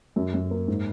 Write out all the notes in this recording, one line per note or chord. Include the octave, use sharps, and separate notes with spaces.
F#2
F#2
A#3
G#2